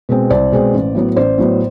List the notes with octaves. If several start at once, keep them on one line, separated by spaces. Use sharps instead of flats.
B2 G#3 C4
C2 C5 D5
B2 G#3 C4
A1
A2 F#3 B3
A1 C5 D5
A2 F#3 B3